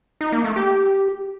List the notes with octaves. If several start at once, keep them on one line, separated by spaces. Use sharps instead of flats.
D#4
A#3
A3
G4